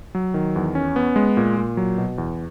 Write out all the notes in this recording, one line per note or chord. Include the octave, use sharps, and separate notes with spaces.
F#3
D#3
E2
C#4
B3
G#3
A#2
A#2
F#3
B2
E2